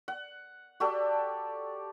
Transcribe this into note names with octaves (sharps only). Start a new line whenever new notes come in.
F#5
F#4 G4 A4 D5